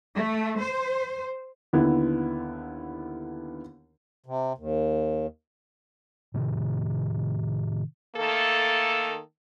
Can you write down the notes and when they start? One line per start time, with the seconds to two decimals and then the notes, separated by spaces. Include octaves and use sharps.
0.16 A3
0.61 C5
1.73 D#2 D3 B3 E4
4.26 C3
4.58 D#2
6.34 A2 C3 D#3
8.16 D#3 A3 A#3 A4